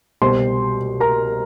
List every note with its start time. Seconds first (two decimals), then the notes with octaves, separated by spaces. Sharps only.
0.22 C2 B2 G3 C5 C6
1.00 A#4 A#5